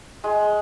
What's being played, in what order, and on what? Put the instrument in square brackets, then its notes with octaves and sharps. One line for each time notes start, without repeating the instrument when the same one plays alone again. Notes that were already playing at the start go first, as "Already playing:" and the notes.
[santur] G#3